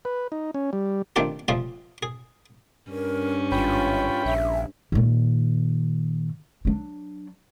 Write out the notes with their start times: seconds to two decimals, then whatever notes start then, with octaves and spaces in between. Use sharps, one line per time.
0.05 B4
0.32 D#4
0.54 C#4
0.73 G3
1.16 D#3 A3 C4 D4 F4 G4
1.48 F3 G3 A3 F4 G#4
2.03 G#4
2.91 G2 C#4 A#4
3.52 G#1 F4 C#5 G5 B5
4.25 A#1 E5
4.92 A#2 D#3
6.65 F#3 D4